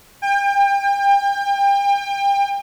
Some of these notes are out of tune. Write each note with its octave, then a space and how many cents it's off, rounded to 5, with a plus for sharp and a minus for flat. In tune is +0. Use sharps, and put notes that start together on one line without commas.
G5 +35